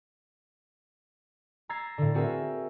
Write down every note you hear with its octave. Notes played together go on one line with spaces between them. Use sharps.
A#5 E6 G#6 A6 B6 C7
A2 D3
C4 F#4 G#4 A#4 E5